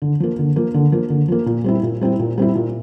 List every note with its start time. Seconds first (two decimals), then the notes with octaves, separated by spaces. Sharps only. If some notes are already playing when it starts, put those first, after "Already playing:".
0.02 D3
0.20 F3 A#3
0.39 D3
0.56 F3 A#3
0.74 D3
0.92 F3 A#3
1.10 D3
1.28 F3 A#3
1.46 A#2
1.64 G3 C4 E4
1.83 A#2
2.01 G3 C4 E4
2.20 A#2
2.38 G3 C4 E4
2.55 A#2